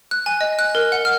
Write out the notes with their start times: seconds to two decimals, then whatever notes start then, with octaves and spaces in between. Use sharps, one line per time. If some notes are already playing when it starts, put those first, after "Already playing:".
0.11 F#6
0.26 G#5
0.41 D#5
0.59 F#6
0.75 A#4
0.92 F#5
1.05 F6